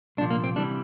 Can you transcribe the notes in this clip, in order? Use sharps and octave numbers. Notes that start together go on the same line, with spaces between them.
C2 A#2 F3 D4
A#3
C4
C3 E3 G3 D4